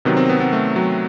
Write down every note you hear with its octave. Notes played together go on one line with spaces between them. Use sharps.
C3 D#3 F#3 B3
C4
B3
B3
A3
F#3